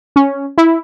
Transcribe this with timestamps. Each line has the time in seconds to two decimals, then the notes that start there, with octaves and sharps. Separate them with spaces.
0.16 C#4
0.58 E4